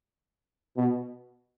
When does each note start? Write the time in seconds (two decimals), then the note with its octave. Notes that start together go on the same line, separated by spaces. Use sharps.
0.77 B2